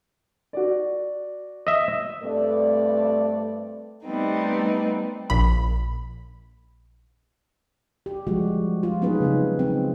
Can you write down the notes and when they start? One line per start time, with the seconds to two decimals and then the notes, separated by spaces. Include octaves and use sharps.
0.53 F#4 D5
1.67 D#5 E5
2.22 G2 A3 C4 A4 B4 D5
4.06 G3 A3 B3 C4 D#4
5.30 A#1 B5
8.06 G4
8.27 F3 G3 G#3 F#4 G4
8.83 F4
9.02 F#3 B3 C#4 D#4 G#4 B4
9.21 C#3 B3 C4 D#4
9.59 C4 D#4